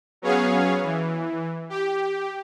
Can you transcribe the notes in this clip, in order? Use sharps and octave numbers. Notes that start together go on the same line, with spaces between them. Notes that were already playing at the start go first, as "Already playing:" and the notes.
F#3 B3 C#4 G#4 C#5 F5
E3
G4